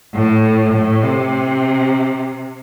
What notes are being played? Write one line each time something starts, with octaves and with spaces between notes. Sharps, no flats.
A2
A2
C3